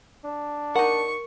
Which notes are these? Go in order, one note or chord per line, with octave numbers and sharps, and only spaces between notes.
D4
D#4 A#4 F#5 C#6